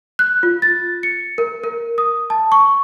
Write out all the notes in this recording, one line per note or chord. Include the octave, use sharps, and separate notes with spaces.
F#6
F4
A6
C#7
A#4
A#4
D#6
A5
C#6